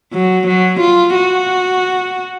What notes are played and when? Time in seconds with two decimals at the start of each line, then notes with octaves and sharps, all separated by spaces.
0.13 F#3
0.47 F#3
0.80 F4
1.15 F#4